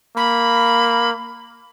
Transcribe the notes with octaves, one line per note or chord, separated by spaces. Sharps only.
A#3 B5